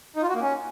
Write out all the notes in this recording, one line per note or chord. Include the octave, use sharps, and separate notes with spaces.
D#4
F4
F#4
A#3
C#4